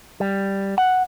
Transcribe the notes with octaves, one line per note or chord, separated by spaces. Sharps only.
G3
F#5